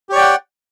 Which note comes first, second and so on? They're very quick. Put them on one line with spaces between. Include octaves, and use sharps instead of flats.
G4 C#5 D5 G5 F#5